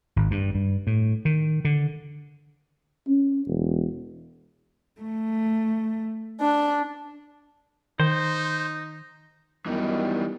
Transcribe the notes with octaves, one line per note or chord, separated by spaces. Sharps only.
G#1
G2
G2
A2
D#3
D3
C#4
E1
A3
D4
D#3 D#4 C5
F#2 D#3 E3 G3 B3 D#4